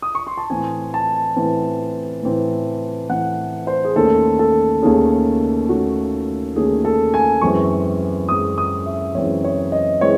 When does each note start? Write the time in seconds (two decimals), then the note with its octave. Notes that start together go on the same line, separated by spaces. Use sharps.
0.02 D#6
0.15 C#6
0.27 C6
0.37 A5
0.50 A2 E3 C4 G#5
0.94 A5
1.36 A2 E3 C4
2.23 A2 E3 C4
3.09 A2 E3 C4 F#5
3.67 C5
3.85 G#4
3.96 D#2 D#3 A3 C#4 A4
4.39 A4
4.82 D#2 D#3 A3 C#4 G#4
5.69 D#2 D#3 A3 C#4 F#4
6.55 D#2 D#3 A3 C#4 G#4
6.85 A4
7.14 G#5
7.41 F#2 E3 G#3 C4 C#6
8.29 F#2 E3 G#3 C4 D#6
8.58 D#6
8.86 E5
9.15 F#2 E3 G#3 C4 C#5
9.44 C#5
9.72 D#5
10.01 E3 G#3 C4 C#5